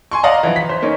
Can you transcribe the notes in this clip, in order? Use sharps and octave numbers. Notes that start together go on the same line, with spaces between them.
G#5 C6 C#6
D5 D#5 F5 F#5 A#5
E3 F3
B6
C5
A#3 C#4 D#4